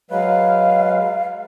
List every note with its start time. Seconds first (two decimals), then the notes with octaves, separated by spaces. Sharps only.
0.10 F#3 G#3 B4 F5